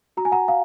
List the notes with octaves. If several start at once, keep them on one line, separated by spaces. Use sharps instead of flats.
F#4 A#5
G#5
F#5 A#5
F5